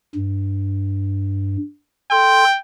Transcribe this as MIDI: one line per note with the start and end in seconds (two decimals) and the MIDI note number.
0.15 1.57 43
2.11 2.44 69
2.11 2.58 79
2.11 2.44 84